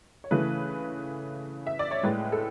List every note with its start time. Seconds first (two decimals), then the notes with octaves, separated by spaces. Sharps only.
0.24 C#5
0.31 C#3 E3 A3 B4
1.67 E5
1.79 D5
1.91 C#5
2.03 A2 G#3 B4
2.32 A4